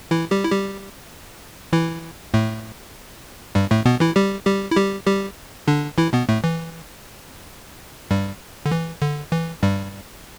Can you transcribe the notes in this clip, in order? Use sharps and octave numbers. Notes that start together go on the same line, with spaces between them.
E3 E4
G3 G4
E4
G3 G4
E3 E4
A2 A3
G2 G3
A2 A3
B2 B3
E3 E4
G3 G4
G3 G4
E4
G3 G4
G3 G4
D3 D4
E3 E4
B2 B3
A2 A3
E3
G2 G3
D3
E3
D3
E3
G2 G3